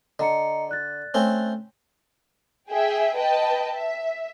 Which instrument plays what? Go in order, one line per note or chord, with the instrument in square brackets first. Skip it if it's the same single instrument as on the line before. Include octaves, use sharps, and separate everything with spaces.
[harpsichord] D3 [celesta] D#5 A#5 C#7
[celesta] D5 F#6 A6
[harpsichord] A3 C4 C#4
[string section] G#4 E5 G5
B4 D#5 G5 A5
E5